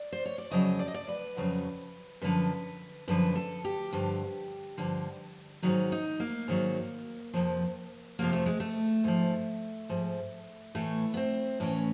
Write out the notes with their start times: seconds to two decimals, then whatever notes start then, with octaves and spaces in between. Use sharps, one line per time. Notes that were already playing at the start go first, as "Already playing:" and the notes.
Already playing: D5
0.12 C5
0.25 C#5
0.38 D5
0.51 F2 C#3 F#3 D#5
0.79 D5
0.88 D#5
0.94 D5
1.08 B4
1.37 F2 C#3 F#3
2.21 F#2 D3 F3 B4
3.07 F#2 D3 F3 B4
3.35 A4
3.65 G4
3.92 G2 D3 F3
4.77 G2 D3 F3
5.62 G#2 D#3 F#3 D#4
5.92 D#4
6.20 A#3
6.48 G#2 D#3 F#3
7.33 F2 C3 F3
8.19 F2 C3 F3 A#3
8.33 A3
8.46 G#3
8.60 A3
9.04 G#2 F3
9.89 G#2 F3
10.75 A2 E3 A3
11.14 B3
11.17 C4
11.60 A2 E3 C#4